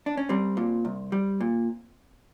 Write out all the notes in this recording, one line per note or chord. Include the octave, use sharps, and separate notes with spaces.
D4
C#4
G3 C4
A#2
C2
G3
A#2